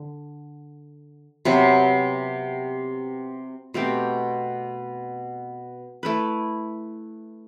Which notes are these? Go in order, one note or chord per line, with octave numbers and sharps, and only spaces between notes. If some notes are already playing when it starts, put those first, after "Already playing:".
Already playing: D3
C3 F#3 B3
B2 A3 C4 G4
A3 E4 B4